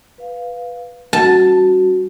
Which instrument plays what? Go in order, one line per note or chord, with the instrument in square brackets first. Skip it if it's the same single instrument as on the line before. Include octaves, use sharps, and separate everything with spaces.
[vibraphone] B4 F5
[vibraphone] G3 C#4 F#4 [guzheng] A5